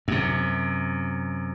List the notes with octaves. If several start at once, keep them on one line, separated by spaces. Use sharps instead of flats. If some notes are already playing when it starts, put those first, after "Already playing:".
F#2 C3